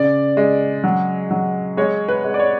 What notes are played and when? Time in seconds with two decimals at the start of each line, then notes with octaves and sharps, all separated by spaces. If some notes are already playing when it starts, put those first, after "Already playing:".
Already playing: C#3 D5
0.37 G#3
0.84 F#3
1.31 F#3
1.77 G#3 C#5
2.08 B4
2.24 G#3
2.34 D5
2.39 C#5